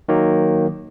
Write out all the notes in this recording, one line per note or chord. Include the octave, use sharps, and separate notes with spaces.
D#3 F#3 A#3